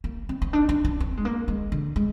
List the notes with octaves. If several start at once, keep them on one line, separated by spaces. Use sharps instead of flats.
A#3
C4
C4
D4
D4
D4
C4
G#3
A#3
G#3
D3
G#3